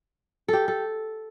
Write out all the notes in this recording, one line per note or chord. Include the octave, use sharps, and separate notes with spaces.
G4 A4
A4